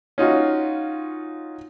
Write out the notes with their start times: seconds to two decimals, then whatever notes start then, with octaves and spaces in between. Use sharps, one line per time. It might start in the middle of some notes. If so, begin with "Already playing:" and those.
0.18 C#4 D#4 F4 F#4